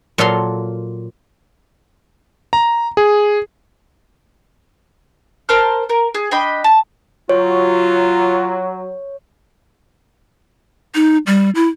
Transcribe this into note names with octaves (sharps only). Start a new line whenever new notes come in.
A#2 F#3 F4 A4 F5 C6
A#5
G#4
A#4 C5 A5 F6
A#4
G#4
D4 D#5 G5 B5
A5
F#3 F4 C#5
D#4
G3
E4